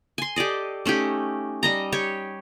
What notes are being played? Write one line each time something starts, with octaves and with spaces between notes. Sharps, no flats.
G#5 C6
G4 A4 D5 D#5
A3 C#4 D#4 G4
G3 D#5 A#5
G4 C#5